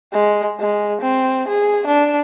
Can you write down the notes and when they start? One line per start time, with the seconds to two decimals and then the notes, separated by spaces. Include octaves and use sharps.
0.13 G#3
0.60 G#3
1.02 C4
1.48 G#4
1.87 D4